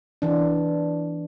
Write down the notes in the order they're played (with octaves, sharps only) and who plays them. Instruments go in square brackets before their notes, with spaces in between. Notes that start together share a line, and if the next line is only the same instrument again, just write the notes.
[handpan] E3 D4